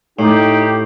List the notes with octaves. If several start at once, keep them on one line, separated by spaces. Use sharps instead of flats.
A2 D#4 G4